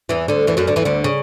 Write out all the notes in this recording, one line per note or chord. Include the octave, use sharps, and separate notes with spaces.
E2 E3
D2 D3
E2 E3
F#2 F#3
D2 D3
E2 E3
D2 D3
C#3